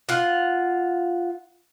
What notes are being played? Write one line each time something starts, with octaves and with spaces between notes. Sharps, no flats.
F4 F#5